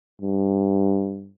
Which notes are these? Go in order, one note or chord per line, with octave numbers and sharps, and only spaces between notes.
G2